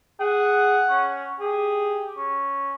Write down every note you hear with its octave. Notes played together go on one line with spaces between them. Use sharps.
G#4 F#5
C#4
G4 G#4
C#4